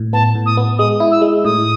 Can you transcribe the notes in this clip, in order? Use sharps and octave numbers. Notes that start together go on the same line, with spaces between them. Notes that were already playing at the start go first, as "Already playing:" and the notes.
Already playing: A2
B3 A5
A2
D#6
B3
G#3 D#6
E4
E6
G#3
A2 D#6